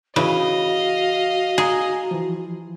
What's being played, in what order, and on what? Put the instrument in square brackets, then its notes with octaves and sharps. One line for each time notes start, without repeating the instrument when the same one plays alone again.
[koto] C#3 E3 [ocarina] F#4 [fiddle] D#5 F5
[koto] G#4 [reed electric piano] G#5 A#5
[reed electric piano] E3 F3